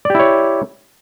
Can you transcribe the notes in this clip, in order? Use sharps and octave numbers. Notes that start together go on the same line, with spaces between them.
E4 G4 C#5 D5